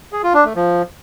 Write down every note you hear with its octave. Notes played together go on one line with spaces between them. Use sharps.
G#4
F4
D4
A3
F3